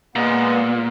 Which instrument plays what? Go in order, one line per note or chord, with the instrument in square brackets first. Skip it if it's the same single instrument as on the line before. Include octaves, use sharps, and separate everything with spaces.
[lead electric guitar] A#2 [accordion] G#3 B3